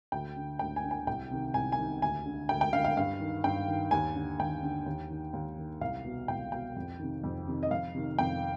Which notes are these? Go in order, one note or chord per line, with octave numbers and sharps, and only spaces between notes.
D2 G5
D3
D2 G5
G#5
D3
G#5
C2 G5
C3 D#3
C2 G#5
G#5
C3 D#3
D2 G#5
D3
D2 G5
G5
D3 F5
F5
G2 F5
D#3
G2 G5
D#3
D#2 G#5
D3
D#2 G5
D3
D#2
D#3
D#2
D#3
C2 F5
B2
C2 G5
B2 G5
F2
C3 D#3
F2
C3 D#3
D#5
F2 F5
C3 D#3
F2 G5